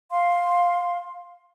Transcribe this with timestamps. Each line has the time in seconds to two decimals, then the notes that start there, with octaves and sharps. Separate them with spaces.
0.11 F5 C6